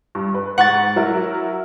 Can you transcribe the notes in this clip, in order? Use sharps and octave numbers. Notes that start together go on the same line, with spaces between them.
G2
B4
G#2 F#5 C#6 A6
F#3 E4 A#4